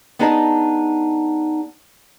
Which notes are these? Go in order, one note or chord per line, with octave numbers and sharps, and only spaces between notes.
B3 D4 D#4 G#4 D#5 A5